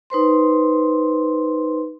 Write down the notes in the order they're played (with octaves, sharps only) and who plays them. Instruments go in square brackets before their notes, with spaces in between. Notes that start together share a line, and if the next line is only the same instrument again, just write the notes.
[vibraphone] D#4 B4 C5 C6